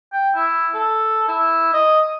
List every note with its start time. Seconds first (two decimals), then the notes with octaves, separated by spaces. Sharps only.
0.12 G5
0.35 E4
0.74 A4
1.28 E4
1.73 D#5